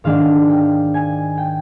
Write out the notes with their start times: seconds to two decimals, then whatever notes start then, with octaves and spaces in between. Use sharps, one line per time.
0.04 G#2 D#3 G#3 D4 F5
0.49 G5
0.94 G#5
1.38 G5